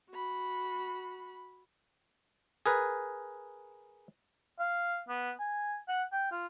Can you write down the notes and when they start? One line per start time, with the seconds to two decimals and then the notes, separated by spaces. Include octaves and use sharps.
0.10 F#4 B5
2.66 G#4 A#4 B4
4.59 F5
5.09 B3
5.39 G#5
5.89 F#5
6.13 G5
6.32 F4